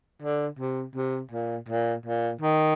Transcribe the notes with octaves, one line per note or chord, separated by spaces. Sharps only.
D3
C3
C3
A#2
A#2
A#2
D#3